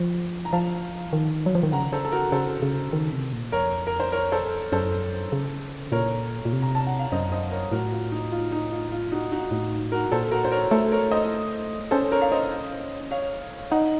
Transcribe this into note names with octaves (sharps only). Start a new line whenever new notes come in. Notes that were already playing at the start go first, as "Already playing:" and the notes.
Already playing: F3
A#5
F3 F5 A5
D#3
F#3
F3
D#3
C#3 F#5 A#5
A4 C5
A4
F#4 A#4
C#3 A4 C5
C#3
D#3
C3
A#2
F2 A#4 C#5
A#4
C5
A#4 C#5
A4 C5
F#2 A4 C5
C#3
A#2 A#4 C#5
A#2
C3
A#5
A5
F#5
F5
F#2 C5 D#5
C5 D#5
A#4 C#5
A2 F#4 A#4
F4
D#4
F4
D#4
F4
F4
D#4 F#4
D#4 F#4
A2
F#4 A#4
A#2 A4 C5
F#4 A#4
C5
A#4 C#5
A3 A4 C5
A#4 C#5
C5 D#5
C#4 A4 C5
A#4 C#5
F5
C5 D#5
C#5 F5
D#4 D#5 F#5